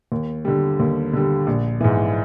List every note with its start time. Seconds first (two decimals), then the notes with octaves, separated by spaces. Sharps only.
0.12 D#2
0.45 D3 G3
0.80 D#2
1.13 D3 G3
1.47 A#1
1.81 G#2 E3